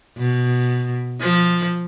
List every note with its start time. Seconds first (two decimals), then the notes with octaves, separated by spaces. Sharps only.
0.18 B2
1.21 F3